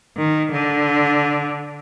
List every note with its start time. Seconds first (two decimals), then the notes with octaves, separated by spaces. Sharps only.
0.17 D#3
0.52 D3